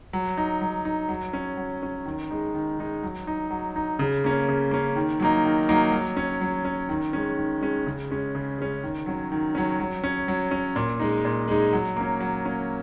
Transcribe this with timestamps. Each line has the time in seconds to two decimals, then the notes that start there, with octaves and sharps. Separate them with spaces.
0.13 F#3
0.37 D#4
0.61 F#3
0.85 D#4
1.09 F#3
1.33 C#4
1.57 F#3
1.83 C#4
2.05 D#3
2.31 G#3 D#4
2.55 D#3
2.79 G#3 D#4
3.03 F#3
3.27 D#4
3.51 F#3
3.76 D#4
3.99 C#3
4.24 A#3 C#4
4.48 C#3
4.71 A#3 C#4
4.96 D#3
5.20 F#3 A#3 D#4
5.45 D#3
5.69 F#3 A#3 D#4
5.92 F#3
6.17 C#4
6.41 F#3
6.65 C#4
6.89 D#3
7.13 G#3 C#4
7.38 D#3
7.61 G#3 C#4
7.86 C#3
8.10 G#3 C#4
8.35 C#3
8.58 G#3 C#4
8.83 D#3
9.06 F#3 C#4
9.32 D#3
9.55 F#3 C#4
9.80 F#3
10.04 C#4
10.28 F#3
10.51 C#4
10.76 A#2
11.00 G#3 D#4
11.25 A#2
11.48 G#3 D#4
11.73 F#3
11.96 A#3 C#4
12.20 F#3
12.45 A#3 C#4